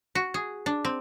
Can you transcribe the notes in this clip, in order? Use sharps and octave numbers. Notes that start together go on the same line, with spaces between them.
F#4
G#4
D4
C4